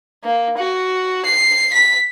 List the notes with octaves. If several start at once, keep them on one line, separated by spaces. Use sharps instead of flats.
A#3
F#4
C7
B6